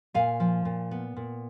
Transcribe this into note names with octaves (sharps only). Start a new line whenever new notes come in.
A#2 F5 G#5
F3
A#2
B3
A#2